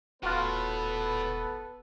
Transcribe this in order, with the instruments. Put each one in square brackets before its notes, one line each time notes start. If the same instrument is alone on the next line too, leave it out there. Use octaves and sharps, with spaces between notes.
[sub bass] D#1 [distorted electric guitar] A2 [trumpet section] B3 A4 B4 [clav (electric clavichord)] F4 F#4